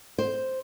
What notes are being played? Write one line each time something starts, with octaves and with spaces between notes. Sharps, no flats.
C5